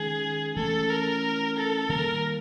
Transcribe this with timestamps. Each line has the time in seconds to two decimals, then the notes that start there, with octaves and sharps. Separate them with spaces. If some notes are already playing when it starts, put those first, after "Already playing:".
Already playing: D#3 G#3 C#4 G#4
0.56 E3 A3 C#4 A4
0.89 A#4
1.57 A4
1.89 D#3 G3 A#3 A#4